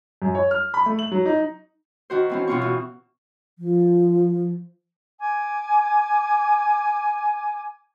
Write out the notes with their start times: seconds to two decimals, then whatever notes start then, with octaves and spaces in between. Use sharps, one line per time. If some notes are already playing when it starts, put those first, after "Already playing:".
0.22 F#2
0.35 C#5
0.51 F6
0.74 B5
0.86 A3
0.99 F#7
1.12 F#3
1.26 D#4
2.10 D#3 F#4 C5
2.30 E3 C4 C#4
2.47 B2 C4 F4 C#6
2.61 E3
3.59 F3
5.20 G#5 D6